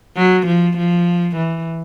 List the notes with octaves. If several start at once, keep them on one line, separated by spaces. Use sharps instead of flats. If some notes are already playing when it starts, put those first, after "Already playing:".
F#3
F3
F3
E3